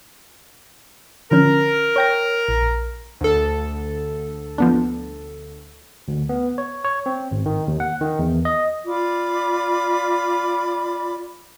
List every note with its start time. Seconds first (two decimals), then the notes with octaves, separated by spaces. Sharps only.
1.31 D3 F3 C#4 A#4
1.96 C#5 G5 A#6
2.48 A#1
3.21 D2 A4
4.58 F3 B3 D4
6.08 D2
6.29 B3
6.58 C#5
6.85 C#5
7.06 C4
7.31 G#1
7.46 D#3
7.68 D#2
7.80 F#5
8.01 D#3
8.19 E2
8.45 D#5
8.86 F4 D5 B5 D6